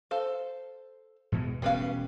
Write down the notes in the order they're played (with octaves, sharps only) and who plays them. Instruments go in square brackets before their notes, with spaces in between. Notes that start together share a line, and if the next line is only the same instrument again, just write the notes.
[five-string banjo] A4 C5 F5
[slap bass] E2 B2 G#3
[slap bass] E1 B2 C#4 [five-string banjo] G3 B4 F5